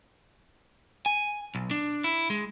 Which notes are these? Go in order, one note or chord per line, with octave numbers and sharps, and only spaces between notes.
G#5
B1
D4
E4
G#3